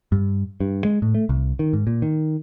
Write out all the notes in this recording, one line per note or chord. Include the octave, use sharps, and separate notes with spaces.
G2
G2
G#3
A2
A3
C2
D#3
G#2
A#2
D#3